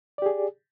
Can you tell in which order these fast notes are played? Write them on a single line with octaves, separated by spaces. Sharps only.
D5 G4 G#4